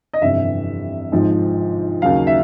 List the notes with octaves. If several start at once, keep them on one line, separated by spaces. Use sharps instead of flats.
D#5
G1 F2 C3 E3 E5
G#1 G#2 F3
D#2 C#3 F#3 F5
E5